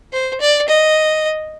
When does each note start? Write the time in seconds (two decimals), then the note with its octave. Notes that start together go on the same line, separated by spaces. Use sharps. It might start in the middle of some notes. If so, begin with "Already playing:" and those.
0.13 C5
0.41 D5
0.68 D#5